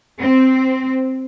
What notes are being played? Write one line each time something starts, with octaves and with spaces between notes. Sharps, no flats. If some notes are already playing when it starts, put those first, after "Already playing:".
C4